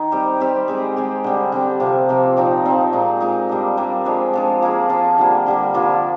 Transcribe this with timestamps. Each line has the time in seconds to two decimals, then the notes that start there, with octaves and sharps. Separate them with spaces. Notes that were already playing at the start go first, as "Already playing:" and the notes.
Already playing: D#3 D#4
0.12 G3 C4 G4
0.40 G3 C4 G4
0.68 G#3 C4 G4
0.96 G#3 C4 G4
1.24 D3 G3 C4
1.52 D3 G3 C4
1.80 C3 F3 A#3
2.09 C3 F3 A#3
2.37 A#2 F3 C4 D#4
2.65 A#2 F3 C4 D#4
2.93 A#2 G#3 D#4
3.20 A#2 G#3 D#4
3.49 G3 A#3 D4
3.77 G3 A#3 D4
4.05 F3 G#3 D4
4.33 F3 G#3 D4
4.62 F3 A#3 F4 G#4
4.89 F3 A#3 F4 G#4
5.18 D3 G3 A#3
5.46 D3 G3 A#3
5.74 D3 F3 A#3 F4